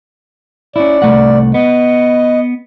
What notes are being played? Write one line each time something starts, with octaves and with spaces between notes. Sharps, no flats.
C#4 E4 D5
C2 A3 F#5
B3 D#5